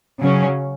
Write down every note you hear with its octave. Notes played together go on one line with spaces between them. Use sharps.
C#3 F#3 C#4